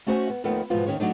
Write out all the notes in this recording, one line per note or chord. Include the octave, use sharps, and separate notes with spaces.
A3 C#4 F#4 C5 E5 G#5
B3
D#2 D#3 F3 A3 B3
G#2 B2 E3 F3 B3 F4
D#2 G#2 D#3 C#4 C#5
F#3 A3 D4 D#4